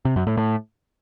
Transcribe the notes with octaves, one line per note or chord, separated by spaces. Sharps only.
C3
F#2
A2
A2